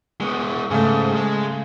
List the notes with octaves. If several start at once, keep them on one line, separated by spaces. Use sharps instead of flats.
G#3 B3
G#2 C#3 A3
G#3